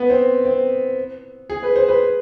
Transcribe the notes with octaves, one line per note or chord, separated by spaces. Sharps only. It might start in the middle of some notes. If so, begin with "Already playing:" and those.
Already playing: B3
C4
C4
G#4
B4
C5
B4